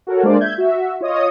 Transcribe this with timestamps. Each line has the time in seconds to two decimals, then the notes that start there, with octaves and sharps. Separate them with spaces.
0.07 F#4 A4 A#4 C#5
0.23 G#3 A#3 D4 F4 C5 D5
0.41 E5 G6 G#6
0.58 F#4 E5
1.01 F4 C#5 D#5 D#6